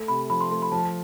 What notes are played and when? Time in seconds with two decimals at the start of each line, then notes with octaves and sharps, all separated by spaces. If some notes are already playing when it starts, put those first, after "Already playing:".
Already playing: A3
0.08 C3 B5
0.30 F3 B5
0.41 C6
0.51 A3 C6
0.62 B5
0.72 F3 A5